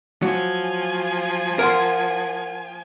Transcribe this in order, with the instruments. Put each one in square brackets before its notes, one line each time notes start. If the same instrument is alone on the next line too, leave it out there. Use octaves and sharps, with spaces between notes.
[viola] F3 G#5 [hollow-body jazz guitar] F#3
[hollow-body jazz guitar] A#4 F#5 C6